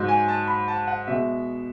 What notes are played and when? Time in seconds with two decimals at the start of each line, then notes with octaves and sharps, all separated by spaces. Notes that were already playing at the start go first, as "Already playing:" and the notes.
Already playing: G#2 F#3
0.08 G#5
0.28 A5
0.48 B5
0.68 A5
0.87 F#5
1.07 B2 G#3 E5